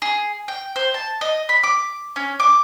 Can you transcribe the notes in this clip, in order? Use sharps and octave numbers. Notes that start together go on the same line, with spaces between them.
G#4
G5
C5
A5
D#5
B5
D6
C#4
D6